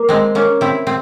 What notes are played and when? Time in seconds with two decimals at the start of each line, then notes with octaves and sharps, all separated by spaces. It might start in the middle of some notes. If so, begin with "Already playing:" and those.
Already playing: A#3
0.09 G#3 C4
0.35 A#3 C#4
0.61 C4 E4
0.87 C4